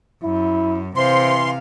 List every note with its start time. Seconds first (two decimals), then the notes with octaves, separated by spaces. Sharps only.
0.24 F#2 E4
0.96 C3 E3 C5 F5 C6